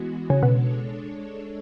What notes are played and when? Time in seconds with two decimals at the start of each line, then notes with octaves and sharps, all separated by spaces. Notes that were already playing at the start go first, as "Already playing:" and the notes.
Already playing: E3 G#3 B3 F#4
0.30 C#3
0.42 B2 G#3 D4 A4 C#5